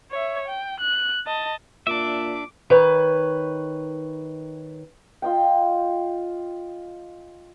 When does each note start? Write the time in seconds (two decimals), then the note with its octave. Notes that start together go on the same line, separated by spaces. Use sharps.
0.11 C#5 E5
0.48 G5
0.80 F#6
1.27 D#5 A5
1.87 A#2 D4 E5 D6
2.70 D#3 B4 C#5
5.22 F4 D#5 G5